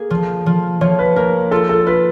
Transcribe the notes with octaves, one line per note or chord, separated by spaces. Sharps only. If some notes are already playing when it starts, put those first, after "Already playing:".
Already playing: A#3 G#4
F3
F3
F3 C#5
B4
A#3 A#4
F4 A4
A4
F4 B4